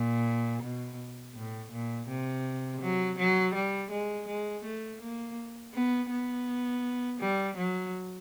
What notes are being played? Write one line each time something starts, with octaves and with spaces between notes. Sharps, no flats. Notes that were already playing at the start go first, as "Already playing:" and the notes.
Already playing: A#2
B2
A2
A#2
C3
F#3
F#3
G3
G#3
G#3
A3
A#3
B3
B3
G3
F#3